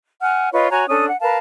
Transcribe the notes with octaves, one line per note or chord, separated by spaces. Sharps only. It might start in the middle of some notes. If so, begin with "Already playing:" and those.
F#5 G#5 F6
F4 B4 C#5 D#5
F#4 C#5 G#5 A#5
C#4 D4 A4 D#6
F#5
A#4 B4 F5 A5